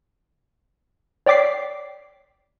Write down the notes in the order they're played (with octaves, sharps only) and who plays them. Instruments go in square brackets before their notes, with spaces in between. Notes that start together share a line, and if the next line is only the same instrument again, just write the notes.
[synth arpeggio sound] C#5 D5 G5 D6 B6 C7